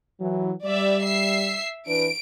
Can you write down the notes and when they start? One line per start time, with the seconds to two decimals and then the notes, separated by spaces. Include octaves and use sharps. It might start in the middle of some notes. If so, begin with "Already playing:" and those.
0.20 E3 F#3
0.64 G3 D5 E5
1.04 E5 C7
1.87 E3 D4 B4 D7